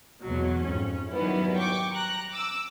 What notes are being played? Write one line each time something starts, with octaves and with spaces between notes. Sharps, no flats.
E2 B2 F#3
F2 G#2 C#4
D#3 F#3 G3 B3 C#4 E4
G5 C#6 D6
A#5 F#6
D6 E6